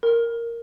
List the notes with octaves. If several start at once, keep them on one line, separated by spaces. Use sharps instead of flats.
A#4